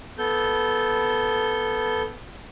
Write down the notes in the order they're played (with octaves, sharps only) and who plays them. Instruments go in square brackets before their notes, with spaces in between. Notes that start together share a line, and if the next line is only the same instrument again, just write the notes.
[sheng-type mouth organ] B3 A4 G6